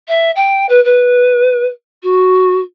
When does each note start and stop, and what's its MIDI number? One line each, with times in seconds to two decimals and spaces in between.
0.08 0.31 76
0.36 0.66 79
0.69 0.82 71
0.84 1.66 71
2.03 2.59 66